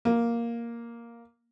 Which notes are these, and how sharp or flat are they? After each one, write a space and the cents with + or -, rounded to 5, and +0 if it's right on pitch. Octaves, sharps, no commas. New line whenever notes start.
A#3 +5